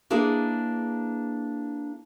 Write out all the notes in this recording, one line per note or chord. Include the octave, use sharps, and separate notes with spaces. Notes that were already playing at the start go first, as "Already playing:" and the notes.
A#3 D4 E4 G#4 B4